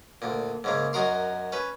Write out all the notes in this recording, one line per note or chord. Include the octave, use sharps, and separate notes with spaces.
D2 A#2
G#2 C#3 A#3
F#2 D#4 F#4 A#4 C6
C#4 B4